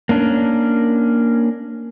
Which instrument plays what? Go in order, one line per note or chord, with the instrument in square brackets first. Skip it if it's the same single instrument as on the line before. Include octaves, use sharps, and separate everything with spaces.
[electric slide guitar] A#3 C#4 D4